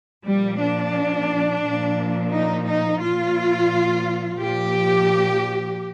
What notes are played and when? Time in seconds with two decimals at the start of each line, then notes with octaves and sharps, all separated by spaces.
0.24 A#2 F3 G3
0.60 D4
1.63 A#2 F3
2.31 D#4
2.66 D#4
3.00 A#2 F3 F4
4.38 A#2 F3 G4